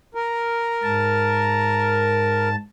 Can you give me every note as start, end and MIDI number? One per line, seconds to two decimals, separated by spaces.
0.15 2.49 70
0.83 2.56 44
0.83 2.56 81